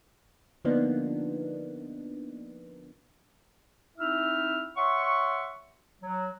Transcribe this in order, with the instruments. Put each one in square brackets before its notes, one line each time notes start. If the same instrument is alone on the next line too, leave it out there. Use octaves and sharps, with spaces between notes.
[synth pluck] D3 F3 A#3 B3 D4 D#4
[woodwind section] C4 D#4 E4 E5 E6 F6
C#5 E5 F#5 C6 C#6
F#3